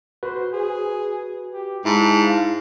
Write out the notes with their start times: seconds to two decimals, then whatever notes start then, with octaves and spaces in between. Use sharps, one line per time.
0.23 F#4 B4 C5
0.53 G#4
1.53 G4
1.85 G#2 E4 A5
2.23 F5